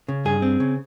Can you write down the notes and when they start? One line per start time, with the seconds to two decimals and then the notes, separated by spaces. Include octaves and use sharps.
0.08 C#3
0.25 G2 G#4
0.42 C4
0.60 C#3